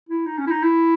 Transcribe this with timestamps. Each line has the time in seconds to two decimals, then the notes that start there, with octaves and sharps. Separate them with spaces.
0.09 E4
0.26 D#4
0.38 C#4
0.47 E4
0.51 D#4
0.63 E4